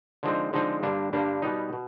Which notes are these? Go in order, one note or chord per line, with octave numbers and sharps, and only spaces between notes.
D3 F3 G#3 C4 D#4
D3 F3 G#3 C4 D#4
G2 D3 G3 A#3 D4
G2 D3 G3 A#3 D4
B2 G3 B3 D#4
B2